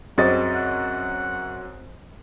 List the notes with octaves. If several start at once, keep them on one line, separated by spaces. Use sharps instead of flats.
F#2 G3 C4 F#4 G#4 D#5 A6
F#5